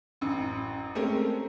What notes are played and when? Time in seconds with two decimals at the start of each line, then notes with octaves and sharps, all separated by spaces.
0.21 A1 F#2
0.95 G#3 A3 C4 C#4 G4 A#4